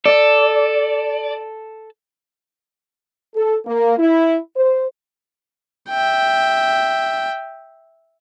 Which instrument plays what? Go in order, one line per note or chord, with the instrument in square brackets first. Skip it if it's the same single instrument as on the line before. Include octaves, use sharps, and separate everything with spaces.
[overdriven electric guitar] A4 [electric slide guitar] D5
[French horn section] A4
A#3
E4
C5
[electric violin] E5 G5